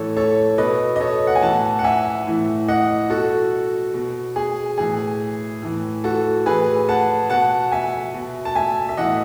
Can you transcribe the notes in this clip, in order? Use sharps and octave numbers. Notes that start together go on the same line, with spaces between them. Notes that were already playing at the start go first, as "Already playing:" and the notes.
Already playing: A2 E3 A4 C#5
A4 C#5
B2 B4 D#5
D#5
A4 C#5
F#5
G#5
A2 E3 F#5 A5
F#5
E5 G#5
A2 E3
D#5 F#5
B2 F#4 A4
B2
G#4
A2 E3 G#4
A2 E3
F#4 A4
A2 E3 G#4 B4
F#5 A5
B2 F#5 A5
E5 G#5
B2
A5
E5 G#5
E5
A2 E3 D#5 F#5